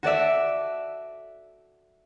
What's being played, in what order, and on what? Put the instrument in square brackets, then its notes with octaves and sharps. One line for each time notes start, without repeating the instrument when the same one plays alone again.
[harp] F#4 A4 D5 E5